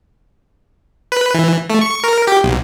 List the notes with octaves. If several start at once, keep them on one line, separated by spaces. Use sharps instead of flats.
B4
E3
A3
C#6
A#4
G4
B1